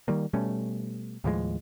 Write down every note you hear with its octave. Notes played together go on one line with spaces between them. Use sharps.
D#3 G3 A#3
B2 G3 A3 C#4
D#2 A2 F3 G#3